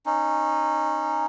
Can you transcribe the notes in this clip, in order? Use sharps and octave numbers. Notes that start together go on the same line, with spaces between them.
C#4 D#4